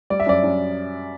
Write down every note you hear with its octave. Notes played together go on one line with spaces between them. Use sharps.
G3 D5
E5
F#2 D5
F#2